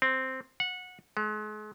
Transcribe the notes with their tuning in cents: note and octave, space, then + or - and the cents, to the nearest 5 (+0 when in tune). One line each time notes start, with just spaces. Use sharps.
C4 +0
F#5 -20
G#3 +40